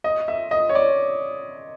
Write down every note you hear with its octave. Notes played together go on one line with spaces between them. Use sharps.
D#5
E5
D#5
C#5
D5